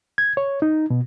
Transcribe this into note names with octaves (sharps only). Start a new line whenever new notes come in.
G#6
C#5
D#4
B2